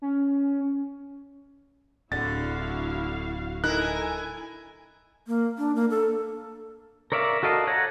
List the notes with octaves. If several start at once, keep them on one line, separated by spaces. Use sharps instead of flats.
C#4
D1 D3 E4 F#4 F5 A6
D#4 E4 A4 A#4 G#5 F#6
A#3
D4
A#3
A4
A#4 C#5 D5 E5 F5
F#4 A4 A#4 D#5 F5
C#5 F5 F#5 A5 A#5